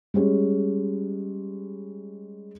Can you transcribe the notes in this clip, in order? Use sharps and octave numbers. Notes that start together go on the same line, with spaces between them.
G3 G#3 C#4